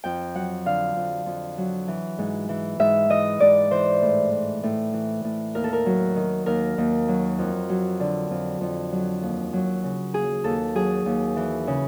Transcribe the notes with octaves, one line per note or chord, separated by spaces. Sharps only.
F2 G5
F#3 F#5
D3 F5
F2
F2
F#3
E3
G#2
E3
G#2 E5
E3 D#5
G#2 D5
E3 C5
A2
E3
A2
E3
A2
D#2 A#4
A4
A#4
F#3
D#3
D#2 A#4
D#2
F#3
F2
F#3
D3
F2
F2
F#3
D#2
F#3
C#3
D#2 G#4
D#2 A4
F#3 G#4
D#2
E3
C#3